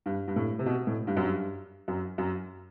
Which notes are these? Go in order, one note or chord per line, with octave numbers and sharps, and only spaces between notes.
G2
G2
A2
C3
B2
A2
G2
F#2
G2
F#2
F#2